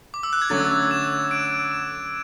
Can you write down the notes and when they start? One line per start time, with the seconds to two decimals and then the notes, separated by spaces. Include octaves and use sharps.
0.14 D6
0.23 E6
0.33 F#6
0.42 G#6
0.50 D3 F#3 A3 C#4 A6
0.91 E7
1.31 D7
1.71 E7